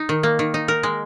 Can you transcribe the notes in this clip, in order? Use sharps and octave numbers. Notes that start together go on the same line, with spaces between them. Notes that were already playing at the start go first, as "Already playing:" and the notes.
Already playing: D#4
D#3
A#3
D#3
D#4
A#4
G#3